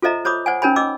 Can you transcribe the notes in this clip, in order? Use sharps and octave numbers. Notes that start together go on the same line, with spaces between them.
F4 A4 C5 D#5 E5 A#5
C5 C#5 B5 D6 D#6
C5 D5 F#5 G#5
C#4 D#4 A#4 C#5 G#5 B5
D#5 D6 E6